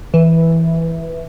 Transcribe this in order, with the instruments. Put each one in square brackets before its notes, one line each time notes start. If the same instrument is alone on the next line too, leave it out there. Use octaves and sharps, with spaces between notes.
[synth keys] E3